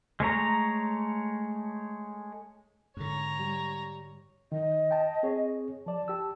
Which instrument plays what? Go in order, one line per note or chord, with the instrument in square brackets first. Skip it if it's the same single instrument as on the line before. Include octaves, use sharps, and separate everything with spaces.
[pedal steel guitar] G#3 A3 C#5 A#5
[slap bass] G#2 D3 [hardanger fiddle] C#5 A#5
[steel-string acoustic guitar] G3
[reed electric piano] D#3 [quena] D#5
[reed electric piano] G5 A5
C4 G#4 C#5
[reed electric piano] F3 D5 [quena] A5
[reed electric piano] G4 E6